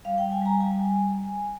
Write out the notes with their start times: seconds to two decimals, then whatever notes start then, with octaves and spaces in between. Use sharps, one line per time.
0.05 G3 F5
0.18 G5
0.23 G3
0.32 G#5
0.42 G3 A#5
0.60 G3 G#5
0.78 G3